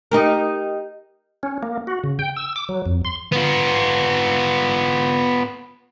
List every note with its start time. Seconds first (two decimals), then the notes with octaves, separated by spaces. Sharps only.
0.11 D#4 G4 A#4
1.43 C#4
1.63 A#3
1.87 F#4
2.04 C#3
2.19 G5
2.36 E6
2.56 D6
2.69 F#3
2.86 F2
3.05 C6
3.32 B3 F4